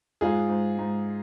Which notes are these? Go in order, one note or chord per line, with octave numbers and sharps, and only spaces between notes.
G#2 F4 G#4
G#2
G#2